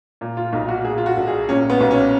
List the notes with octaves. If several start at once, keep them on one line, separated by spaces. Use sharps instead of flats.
A#2
F4
B1 D#4
F#4
A#2 G#4
F4
F#4
A#1
G#4
A#2 C#4
B3
B1 B3
C#4